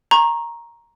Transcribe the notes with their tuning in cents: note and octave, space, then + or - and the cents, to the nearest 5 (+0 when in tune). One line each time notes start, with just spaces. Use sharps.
A#5 +5 C#6 -30